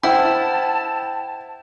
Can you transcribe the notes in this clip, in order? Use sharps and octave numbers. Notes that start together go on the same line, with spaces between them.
E4 C5 F#5 G5 A5